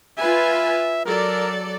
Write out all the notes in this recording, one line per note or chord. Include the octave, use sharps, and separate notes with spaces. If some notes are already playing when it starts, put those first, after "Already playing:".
F4 B4 E5 G#5
F#3 A4 A#4 D5